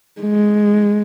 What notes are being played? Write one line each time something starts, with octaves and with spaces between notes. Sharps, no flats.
G#3